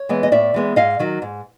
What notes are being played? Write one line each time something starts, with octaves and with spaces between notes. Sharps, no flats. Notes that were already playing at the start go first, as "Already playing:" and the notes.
Already playing: C#5
E3 G#3 B3
D#5
A2 D5 E5
E3 G#3 B3
G#2 D#5 F5
D#3 F#3
G#2